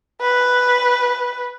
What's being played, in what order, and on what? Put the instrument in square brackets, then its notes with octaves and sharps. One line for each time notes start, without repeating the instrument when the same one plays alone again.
[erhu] B4